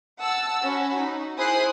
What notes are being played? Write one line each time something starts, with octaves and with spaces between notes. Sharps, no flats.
F#5 A5 E6
C#4 F#4 B5
D#4
E4 G#4 C5 D#6 F#6 C7